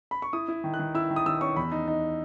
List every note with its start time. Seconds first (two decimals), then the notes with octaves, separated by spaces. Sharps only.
0.11 B5
0.22 C#6
0.33 E4 D#6
0.48 E4
0.64 D#3
0.74 F#6
0.79 D#3
0.95 E4 E6
1.11 D#3
1.16 D#6
1.26 D#3 E6
1.41 C#4 C#6
1.56 E2 B5
1.72 D#4
1.88 D#4